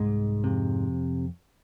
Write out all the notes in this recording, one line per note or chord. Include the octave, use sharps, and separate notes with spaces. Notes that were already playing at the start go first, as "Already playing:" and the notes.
Already playing: C2 G#2 G#3
F2 C3